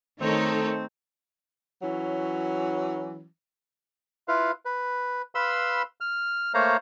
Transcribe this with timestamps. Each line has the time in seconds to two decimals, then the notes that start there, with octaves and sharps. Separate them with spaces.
0.21 D#3 A3 C4 D#4 A4 A#4 C#5
1.83 E3 F#3 C#4
4.28 E4 F4 B4 F5
4.65 B4
5.35 B4 F5 B5 C6 E6
6.01 F6
6.54 A3 A#3 C5 C#5 F5 A#5